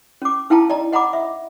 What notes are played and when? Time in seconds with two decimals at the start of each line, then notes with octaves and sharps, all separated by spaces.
0.22 C#4 D6
0.50 D#4 E4 F5 G5 A5 A#5
0.70 D5 D#5 A#5
0.93 D#5 F#5 A#5 B5 D6
1.13 E5